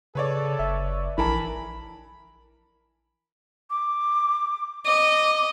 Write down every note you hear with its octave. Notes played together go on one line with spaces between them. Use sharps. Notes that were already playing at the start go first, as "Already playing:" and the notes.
C#3 A4 B4 C#5 D5
F#1 E5
A#1 E3 E4 A#4 A5 B5
D6
D#5 D6